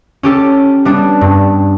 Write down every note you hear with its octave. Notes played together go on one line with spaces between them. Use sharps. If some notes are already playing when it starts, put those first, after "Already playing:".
C#4 G4 A4
G3 B3 D4
G2